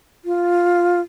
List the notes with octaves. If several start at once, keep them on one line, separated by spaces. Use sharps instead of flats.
F4